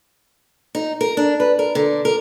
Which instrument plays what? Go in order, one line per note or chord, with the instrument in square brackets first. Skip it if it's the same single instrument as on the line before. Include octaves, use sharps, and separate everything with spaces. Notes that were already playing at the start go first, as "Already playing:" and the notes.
[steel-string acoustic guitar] D#4
A#4
D4
B4
A#4
D3
A#4